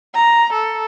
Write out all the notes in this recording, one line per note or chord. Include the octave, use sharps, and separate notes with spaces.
A#5
A4